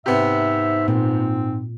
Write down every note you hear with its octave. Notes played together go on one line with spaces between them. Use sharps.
G#2 C3 B3 E5
A#2 C4